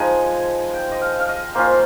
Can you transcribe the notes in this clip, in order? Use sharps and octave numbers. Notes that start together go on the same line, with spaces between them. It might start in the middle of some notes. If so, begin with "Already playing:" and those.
Already playing: F3 G#3 D#4 G#5
G5
D#5
F5
F5
D#5
A#3 C#4 F4 C5